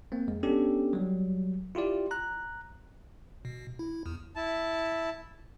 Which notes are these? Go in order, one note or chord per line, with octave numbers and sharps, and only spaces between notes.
A#3 C4
F2 G#3
B3 C#4 D4 G4 A4
F#3 G3
E4 F4 G4 D5
A#5 F#6
B2
E4
E2
E4 A5